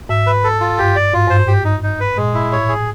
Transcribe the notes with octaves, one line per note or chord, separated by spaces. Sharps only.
G#2 E5
B4
A4
F4
G2 G4
D5
G#2 F4
G2 C5
G#2
G4
D#4
D#4
B4
A#2 G#3
E4
A2 C#5
G#4